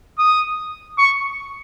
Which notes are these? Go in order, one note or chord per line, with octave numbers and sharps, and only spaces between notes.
D#6
C#6